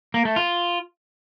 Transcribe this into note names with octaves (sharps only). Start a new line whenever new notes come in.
A#3
A3
F4